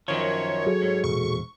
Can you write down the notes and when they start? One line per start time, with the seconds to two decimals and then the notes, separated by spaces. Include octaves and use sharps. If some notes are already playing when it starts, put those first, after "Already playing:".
0.08 F#2 D#3 F3 C#5
0.66 F#3 F#4 G#4 A4
0.82 G#2
1.04 E1 A#2 C#6